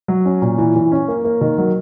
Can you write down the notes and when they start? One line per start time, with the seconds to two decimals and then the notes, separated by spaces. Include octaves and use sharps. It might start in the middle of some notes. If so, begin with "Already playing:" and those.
0.08 F#3
0.25 C#4
0.42 A#2
0.58 E3
0.76 E3
0.92 C#4
1.08 A#3
1.24 A#3
1.41 D#3
1.58 F#3